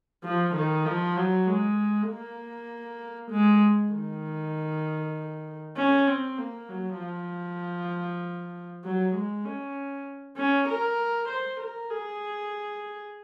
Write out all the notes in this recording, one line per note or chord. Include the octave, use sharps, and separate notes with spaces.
F3
D#3
F3
F#3
G#3
A#3
G#3
D#3
C#4
C4
A#3
F#3
F3
F#3
G#3
C#4
C#4
A#4
C5
A#4
G#4